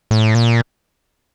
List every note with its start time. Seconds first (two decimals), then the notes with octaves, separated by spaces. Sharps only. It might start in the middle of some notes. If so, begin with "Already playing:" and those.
0.11 A2
0.35 A#2